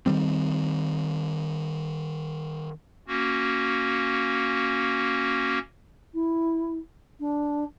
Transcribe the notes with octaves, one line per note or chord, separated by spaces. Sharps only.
D#3 E3 G3 C4
A#3 C#4 F#4
E4
D4